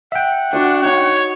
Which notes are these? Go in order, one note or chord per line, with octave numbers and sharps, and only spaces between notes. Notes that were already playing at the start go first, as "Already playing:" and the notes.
E5 F#5 G5
D4 F#4 C#6 D#6
D#4 C#5